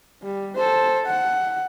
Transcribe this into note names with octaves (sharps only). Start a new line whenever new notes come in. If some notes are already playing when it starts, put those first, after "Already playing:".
G3
A4 C5
F#5